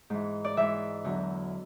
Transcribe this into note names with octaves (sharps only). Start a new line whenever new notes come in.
G#2 E3
D5
G#2 E3 E5
E2 D3 F#3